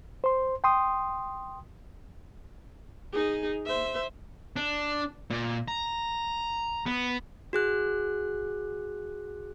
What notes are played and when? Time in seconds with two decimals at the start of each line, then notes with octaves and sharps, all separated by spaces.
0.24 C5 C6
0.64 G5 C6 D#6
3.13 D#4 G#4
3.65 C5 E5
4.56 D4
5.30 A#2
5.68 A#5
6.86 B3
7.53 F#4 G#4 F#6